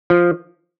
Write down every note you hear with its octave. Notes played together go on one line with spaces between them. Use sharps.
F3